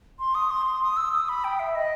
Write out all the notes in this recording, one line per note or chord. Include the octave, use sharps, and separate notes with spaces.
C6
D#6
C6
C6
D#6
E6
D#6
B5
G5
E5
D#5